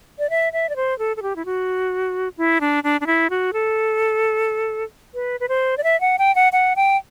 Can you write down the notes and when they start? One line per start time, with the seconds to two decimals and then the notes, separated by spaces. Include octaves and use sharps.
0.19 D5
0.30 E5
0.53 E5
0.69 D5
0.76 C5
0.99 A4
1.17 A4
1.22 G4
1.36 E4
1.45 F#4
2.38 E4
2.61 D4
2.84 D4
3.01 D4
3.07 E4
3.30 F#4
3.53 A4
5.14 B4
5.40 B4
5.49 C5
5.78 D5
5.84 E5
6.01 F#5
6.18 G5
6.35 F#5
6.53 F#5
6.76 G5